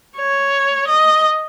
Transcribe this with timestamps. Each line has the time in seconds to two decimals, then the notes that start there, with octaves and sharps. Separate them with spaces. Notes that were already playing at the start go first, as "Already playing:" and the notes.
0.17 C#5
0.87 D#5